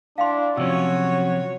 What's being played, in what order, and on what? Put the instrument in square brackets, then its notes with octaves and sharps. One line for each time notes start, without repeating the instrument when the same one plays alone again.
[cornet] D4 [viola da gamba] E4 [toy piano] F5 G5 C6
[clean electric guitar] C3 F3 C#4 [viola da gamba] F#3 C#5 [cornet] F#4 [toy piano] E6